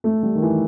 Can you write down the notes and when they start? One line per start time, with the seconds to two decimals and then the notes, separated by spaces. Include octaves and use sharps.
0.04 A3
0.23 G3
0.35 D#3
0.42 E3